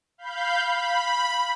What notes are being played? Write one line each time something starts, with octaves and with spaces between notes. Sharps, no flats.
F5 B5 G6
B5